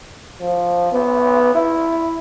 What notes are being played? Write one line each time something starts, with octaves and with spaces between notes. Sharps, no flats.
F3
B3
E4